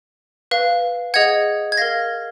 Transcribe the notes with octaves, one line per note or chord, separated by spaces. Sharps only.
B4 F5
G#4 D#5 F#5 G#6
G#6
A#4 F5 A#6